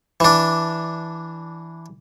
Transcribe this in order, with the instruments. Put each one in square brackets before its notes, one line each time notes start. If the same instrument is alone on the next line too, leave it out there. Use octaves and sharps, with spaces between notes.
[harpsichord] E3 D4